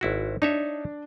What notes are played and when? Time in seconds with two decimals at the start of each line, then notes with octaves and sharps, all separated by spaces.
0.01 G#1 E4 F#4
0.42 D4 D#4 C#5 E5